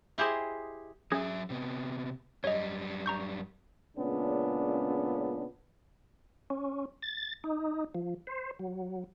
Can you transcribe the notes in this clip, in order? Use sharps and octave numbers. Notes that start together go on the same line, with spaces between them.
E4 G4 G#4 C5 D#5
F#3 C#4 G#4 E5 G#6
C3 B3
F#2 G3 C#5 D#5
A#5 C#6 G6
A#2 C#3 G#3 B3 C#4 D4
C#4
A6
D#4
F3
C5
F#3